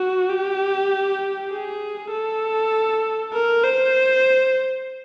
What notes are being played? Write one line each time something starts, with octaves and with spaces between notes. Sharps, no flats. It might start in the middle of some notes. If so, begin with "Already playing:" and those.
Already playing: F#4
G4
G#4
A4
A#4
C5